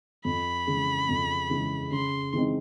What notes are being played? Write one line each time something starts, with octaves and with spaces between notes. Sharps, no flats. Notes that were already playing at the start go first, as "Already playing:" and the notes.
F2 B5
C#3 E3 G#3
F2
C#3 E3 G#3
C#3 C6
E3 G#3 C4 D#4